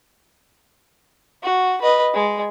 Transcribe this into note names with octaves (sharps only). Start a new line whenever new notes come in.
F#4
B4 D#5
G#3